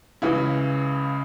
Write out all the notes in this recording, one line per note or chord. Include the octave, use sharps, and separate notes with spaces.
C#2 C#3 E3 E4